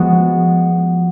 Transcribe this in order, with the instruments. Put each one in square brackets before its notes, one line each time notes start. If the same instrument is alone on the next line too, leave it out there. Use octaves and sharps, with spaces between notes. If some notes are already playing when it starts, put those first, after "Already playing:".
Already playing: [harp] F3 G#3 B3 F#4